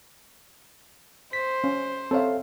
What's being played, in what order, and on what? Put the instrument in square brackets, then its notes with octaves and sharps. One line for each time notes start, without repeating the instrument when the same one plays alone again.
[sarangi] C5 [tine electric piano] B6
[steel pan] C#4
[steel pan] C4 C#5 E5 [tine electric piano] A4 F5